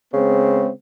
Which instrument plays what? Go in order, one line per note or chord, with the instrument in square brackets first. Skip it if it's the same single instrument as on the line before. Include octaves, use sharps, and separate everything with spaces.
[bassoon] C#3 [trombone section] G#3 B3 C4